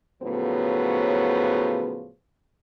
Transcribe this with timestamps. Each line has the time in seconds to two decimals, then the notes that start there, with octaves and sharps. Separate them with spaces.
0.23 A2 C#3 F3 F#3 B3